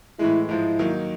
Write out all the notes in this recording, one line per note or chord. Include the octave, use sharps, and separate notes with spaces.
A2 E3 G#3 E4
G#2 F3 G#3 E4
D#3 F#3 A#3 D#4